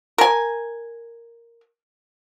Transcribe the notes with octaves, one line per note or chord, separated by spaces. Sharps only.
A#4 G#5